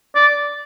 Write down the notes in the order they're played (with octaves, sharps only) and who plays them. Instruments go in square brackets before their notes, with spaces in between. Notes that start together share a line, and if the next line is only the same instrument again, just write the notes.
[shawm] D5